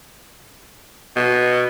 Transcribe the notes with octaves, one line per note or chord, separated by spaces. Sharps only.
B2